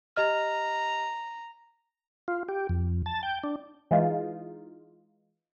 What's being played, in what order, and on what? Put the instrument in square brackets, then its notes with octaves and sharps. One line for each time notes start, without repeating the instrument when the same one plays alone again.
[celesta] G4 D#5 F6 [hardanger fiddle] A#5
[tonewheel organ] F4
G4
F2
A5
G5
D4
[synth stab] E3 G#3 D#4 F4